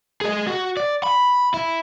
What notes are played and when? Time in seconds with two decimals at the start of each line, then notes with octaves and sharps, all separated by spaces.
0.21 G#4 D#5
0.47 F#4
0.77 D5
1.03 B5
1.54 E4